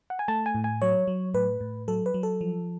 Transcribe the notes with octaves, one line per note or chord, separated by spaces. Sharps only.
F#5
G#5
A3 A5
G#5
A2
G#5
F#3 C#5
F#3
A2 B4
A2
F#3 A4
B4
F#3
A4
F3